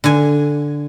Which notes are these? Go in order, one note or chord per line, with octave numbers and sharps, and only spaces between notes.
D3 G#5